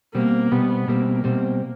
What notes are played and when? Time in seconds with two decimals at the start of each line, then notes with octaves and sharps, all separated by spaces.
0.15 B2 G3 A#3 C4
0.51 B2 G3 B3 C4
0.88 B2 G3 A#3 C4
1.24 B2 G3 C4